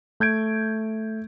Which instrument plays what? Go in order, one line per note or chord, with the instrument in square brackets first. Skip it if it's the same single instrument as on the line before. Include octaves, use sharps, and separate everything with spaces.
[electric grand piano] A3 G6 G#6 D7